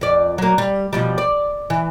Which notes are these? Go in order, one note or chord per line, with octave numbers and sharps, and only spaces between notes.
F2 D5
F#3 A#3
G3
B2 F3 G3
D5
E3